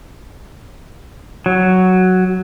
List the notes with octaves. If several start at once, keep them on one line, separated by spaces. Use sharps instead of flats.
F#3